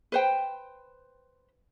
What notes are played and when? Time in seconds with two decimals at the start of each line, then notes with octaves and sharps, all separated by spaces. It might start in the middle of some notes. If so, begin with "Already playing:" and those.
0.12 B4 C5 G5